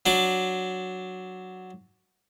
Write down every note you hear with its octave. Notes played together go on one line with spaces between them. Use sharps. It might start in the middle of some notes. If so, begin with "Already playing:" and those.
F#3 D4 D6